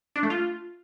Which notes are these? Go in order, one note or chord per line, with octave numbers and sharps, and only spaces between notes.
D4
A3
F4